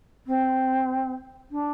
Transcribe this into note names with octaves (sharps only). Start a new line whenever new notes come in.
C4
D4